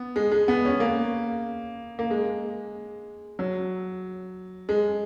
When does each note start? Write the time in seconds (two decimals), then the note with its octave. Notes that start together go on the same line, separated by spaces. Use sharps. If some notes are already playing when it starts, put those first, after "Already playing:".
Already playing: B3
0.16 G#3
0.32 G#3
0.48 B3
0.65 C#4
0.80 A#3
1.99 A#3
2.11 G#3
3.39 F#3
4.69 G#3